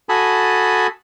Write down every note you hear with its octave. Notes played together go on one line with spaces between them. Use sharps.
F#4 A4 G#5 A5 B5 D#6